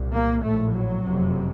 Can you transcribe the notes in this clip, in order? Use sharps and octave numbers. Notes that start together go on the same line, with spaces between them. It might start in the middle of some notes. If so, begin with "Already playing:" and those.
Already playing: C2 A#2
A#3
A#1 A2 A3
F#3
F#1 F2 C3